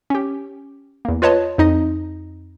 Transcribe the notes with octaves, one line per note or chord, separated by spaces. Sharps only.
C#4 G4
E2 A#3
F4 B4 C#5 D#5 A5
F2 D#4 D#5